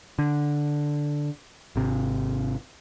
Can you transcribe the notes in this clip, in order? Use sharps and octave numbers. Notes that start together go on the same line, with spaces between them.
D3
G#1 C3